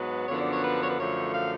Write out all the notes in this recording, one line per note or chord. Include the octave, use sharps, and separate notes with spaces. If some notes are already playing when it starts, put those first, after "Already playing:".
Already playing: G#2 F#3 B3 B4
F#2 D3 F3 B3 D4 C#5
D5
C#5
B4
C#5
B4
F#2 D3 F3 A3 C#5
F5